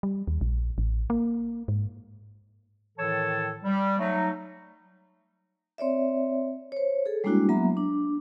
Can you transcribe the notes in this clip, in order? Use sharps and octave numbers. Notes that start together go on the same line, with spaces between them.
G3
D#2
A#1
A1
A#3
G#2
A2 D#3 E3 A4 C#5 A5
G3
F#3 A3 D#4
C4 C#5 D5 E5
C5 C#5
G#4 A4
G3 G#3 A#3 D4 E4 F#4
F#3 A#3 B3 E5 A#5
D4